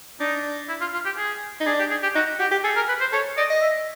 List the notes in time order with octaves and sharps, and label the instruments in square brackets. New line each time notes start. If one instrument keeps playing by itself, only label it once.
[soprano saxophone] D4 [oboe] D#4
[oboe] E4
F4
F4
G4
G#4
[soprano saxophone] D#4
[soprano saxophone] D4 [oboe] G#4
[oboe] G4
G#4
G4
[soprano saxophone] D#4 [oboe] F#4
[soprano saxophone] F#4 [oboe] G4
[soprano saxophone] G4
[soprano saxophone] G#4 [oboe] A4
[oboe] A#4
B4
C5
[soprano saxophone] A4 [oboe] C#5
[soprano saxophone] D5 [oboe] D#5
[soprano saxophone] D#5
[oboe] E5